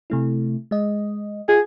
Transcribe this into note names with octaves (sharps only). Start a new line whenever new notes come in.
C3 A3 E4
G#3 D#5
F4 G#4